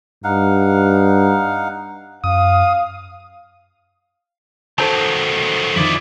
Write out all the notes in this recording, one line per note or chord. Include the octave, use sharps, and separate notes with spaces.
G2 D#4 F5 F#5
F#2 F5 D#6
D#3 F#3 A4 C5 A5
F2 D#3 E4 D5